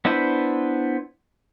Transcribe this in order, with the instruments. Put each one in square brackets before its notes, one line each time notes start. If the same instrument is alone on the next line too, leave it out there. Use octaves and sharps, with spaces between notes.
[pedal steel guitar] B3 D4 E4 B4 C5